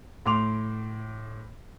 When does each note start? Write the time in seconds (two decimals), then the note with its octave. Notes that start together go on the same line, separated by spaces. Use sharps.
0.26 A2 C6 D6 F7